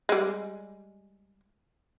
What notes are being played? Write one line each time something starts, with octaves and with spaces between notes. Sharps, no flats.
G3 G#3